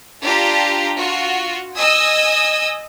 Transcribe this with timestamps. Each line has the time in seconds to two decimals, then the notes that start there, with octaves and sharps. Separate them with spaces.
0.23 D4 F4 G4 A#5
0.97 F4 F#4
1.77 D#5 G#5 D#6 E6